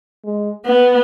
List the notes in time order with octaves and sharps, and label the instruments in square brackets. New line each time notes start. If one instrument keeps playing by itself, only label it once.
[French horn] G#3
[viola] B3 [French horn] B4